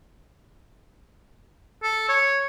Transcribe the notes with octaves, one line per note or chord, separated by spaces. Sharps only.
A4
C#5